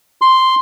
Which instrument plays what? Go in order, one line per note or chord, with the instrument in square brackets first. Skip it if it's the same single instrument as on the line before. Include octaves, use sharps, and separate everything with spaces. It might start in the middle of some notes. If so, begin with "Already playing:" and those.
[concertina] C6